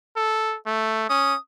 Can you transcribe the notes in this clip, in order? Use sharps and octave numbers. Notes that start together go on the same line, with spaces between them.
A4
A3
C#4 D#6